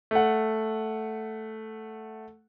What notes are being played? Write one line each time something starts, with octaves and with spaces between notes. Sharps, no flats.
A3 F#5